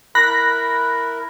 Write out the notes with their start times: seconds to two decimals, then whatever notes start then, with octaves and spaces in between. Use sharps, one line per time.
0.15 E4 A#4 B5 F#6 A#6